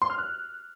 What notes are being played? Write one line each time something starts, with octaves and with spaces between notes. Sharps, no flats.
C6
F6
F#6